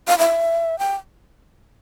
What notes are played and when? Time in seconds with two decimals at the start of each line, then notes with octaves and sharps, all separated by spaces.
0.08 F5
0.19 E5
0.79 G5